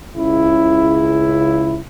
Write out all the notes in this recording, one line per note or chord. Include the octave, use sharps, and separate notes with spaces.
C#2 C#3 E4